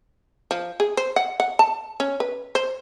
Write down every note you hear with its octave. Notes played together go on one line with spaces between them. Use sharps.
F3
G#4
C5
F#5
F#5
A5
C#4
B4
C5